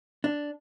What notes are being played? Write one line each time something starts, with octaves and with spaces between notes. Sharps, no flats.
D4